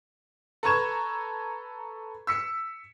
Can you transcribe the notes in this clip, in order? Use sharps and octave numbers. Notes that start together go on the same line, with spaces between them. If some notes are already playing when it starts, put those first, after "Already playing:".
A4 B4 A#5 C#6 G#6 E7
E6 B6 C#7